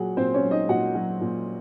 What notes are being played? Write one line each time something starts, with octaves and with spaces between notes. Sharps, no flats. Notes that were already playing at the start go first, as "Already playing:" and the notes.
Already playing: A#2 F#3 F#4 G#4 F#5
A#2 C4 C5
C#4 C#5
F#3
D#4 D#5
A#2 F#4 F#5
F#3
A#2